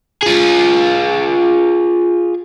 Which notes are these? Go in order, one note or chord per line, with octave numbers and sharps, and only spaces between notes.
F4 G#4